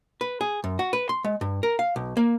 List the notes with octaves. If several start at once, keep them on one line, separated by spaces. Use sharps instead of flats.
B4
G#4
F#2
F#4
B4
C6
G#3
G2
A#4
F5
B1
A#3